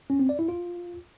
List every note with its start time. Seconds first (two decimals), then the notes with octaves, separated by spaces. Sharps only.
0.10 C#4
0.19 C4
0.29 D5
0.39 E4
0.49 F4